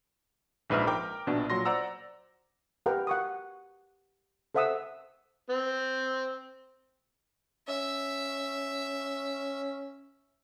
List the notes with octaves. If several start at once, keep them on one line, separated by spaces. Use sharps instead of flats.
A#1 G#2 B4 E5 F6
A#4 G5 D6
A#1 B2 D4 F#4
A#2 F#3 C6 A#6
C5 D5 F#5 A#5 E6
G4 A#4 B4 F#5 G5
F#5 C#6 D#6
A4 C5 E5 F#5 D#6 E6
C4
C#4 E5